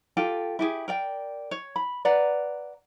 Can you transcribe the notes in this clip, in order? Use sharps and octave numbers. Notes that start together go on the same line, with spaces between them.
F4 G4 A4 G5
E4 G4 G#4
A#4 D5 G5
C#5
B5
B4 D5 F#5 A#5